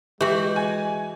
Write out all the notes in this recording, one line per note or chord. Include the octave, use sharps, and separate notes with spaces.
E3 G#3 F#4 G4
G#5